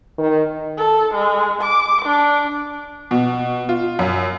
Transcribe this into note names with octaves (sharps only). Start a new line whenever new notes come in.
D#3
A4
G#3
D6
D4
B2
F4
F#2